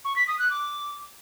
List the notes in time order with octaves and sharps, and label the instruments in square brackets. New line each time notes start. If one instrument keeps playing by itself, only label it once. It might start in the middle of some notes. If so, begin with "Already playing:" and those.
[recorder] C#6
B6
D#6
F#6
D6